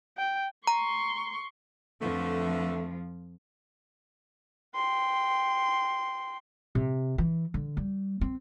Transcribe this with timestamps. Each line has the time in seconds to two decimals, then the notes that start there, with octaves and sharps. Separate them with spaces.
0.17 G5
0.67 A#5 C6 C#6
2.01 F2 D3 E3 F3 A3
4.75 G5 C6
6.75 C3
7.18 E3
7.54 D3
7.77 G3
8.21 C4